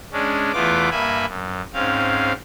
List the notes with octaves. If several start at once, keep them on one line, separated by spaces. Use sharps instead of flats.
G#3 C#4 D4
E2 E3 A3 B3 F4 D6
G2 A#3 E5 G#5 B5
F#2
G#2 C4 C#4 F5